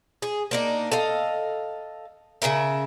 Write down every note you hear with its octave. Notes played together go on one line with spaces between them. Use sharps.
G#4
A#3 D4 D#4
A4 D#5 F5
C#3 E3 A#4 E5